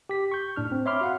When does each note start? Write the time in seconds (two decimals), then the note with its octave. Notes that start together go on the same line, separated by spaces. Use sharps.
0.09 G4 B6
0.32 C#6 G6
0.56 A2 D4 F6
0.72 C4
0.86 C#5 E5 B5 C6 D6 F6
1.01 F#4 F5 F#5